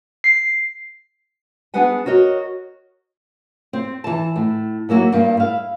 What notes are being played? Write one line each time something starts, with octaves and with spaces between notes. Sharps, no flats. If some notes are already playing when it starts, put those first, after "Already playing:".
C7
B3 D4 G#4 B4 F#5 G#5
F#4 A#4 C#5 D#5
C4
E3 A5
A2
F#3 A#3 E4 F#4
G2 A#3
E4 F5